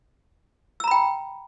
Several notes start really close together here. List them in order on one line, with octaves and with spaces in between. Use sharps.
E6 A#5 B5 G5